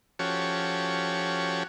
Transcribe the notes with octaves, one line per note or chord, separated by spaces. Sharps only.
F3 C#4 F#4 G4 A4 C#5